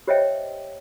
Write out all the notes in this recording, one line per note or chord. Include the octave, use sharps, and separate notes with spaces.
G4 C5 C#5 D#5 E5 G5